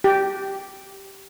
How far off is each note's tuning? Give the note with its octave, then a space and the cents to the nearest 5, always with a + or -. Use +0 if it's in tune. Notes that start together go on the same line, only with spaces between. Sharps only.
G4 -10